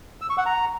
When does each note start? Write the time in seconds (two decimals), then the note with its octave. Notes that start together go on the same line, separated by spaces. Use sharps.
0.21 E6
0.30 C#6
0.38 F#5
0.46 A#5